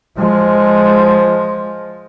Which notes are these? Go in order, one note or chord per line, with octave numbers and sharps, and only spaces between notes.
F3 G#3